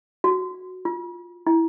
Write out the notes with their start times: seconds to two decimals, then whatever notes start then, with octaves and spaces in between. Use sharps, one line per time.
0.24 F#4
0.85 F4
1.47 E4